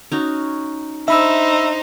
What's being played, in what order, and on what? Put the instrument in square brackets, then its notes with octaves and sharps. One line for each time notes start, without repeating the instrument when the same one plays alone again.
[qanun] C#4 D#4 F#4
[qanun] D4 [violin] D#4 C5 [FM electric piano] E5 B5 E6